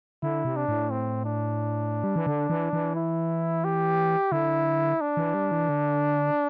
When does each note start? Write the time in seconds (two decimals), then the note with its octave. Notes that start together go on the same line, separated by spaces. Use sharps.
0.23 D3 E4
0.45 C3
0.56 D4
0.68 A2
0.90 C4
1.25 D4
2.04 G3
2.16 E3
2.26 D3
2.50 E3
2.73 E3
2.95 E4
3.64 G4
4.32 D3 E4
5.01 D4
5.17 E3
5.34 G3
5.51 E3
5.69 D3